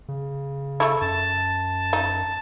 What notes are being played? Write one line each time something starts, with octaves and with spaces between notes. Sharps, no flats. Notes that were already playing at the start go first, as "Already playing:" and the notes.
C#3
A3 E4
F#2 A5
D#4